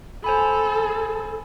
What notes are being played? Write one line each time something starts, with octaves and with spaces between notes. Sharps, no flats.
A4 C5 G#5 B5